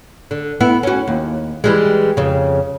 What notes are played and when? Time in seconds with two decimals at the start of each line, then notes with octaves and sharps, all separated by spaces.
0.31 D3
0.61 B3 E4
0.83 C#4 F#4
1.08 D#2
1.64 E3 G3 G#3
2.17 F2 C#3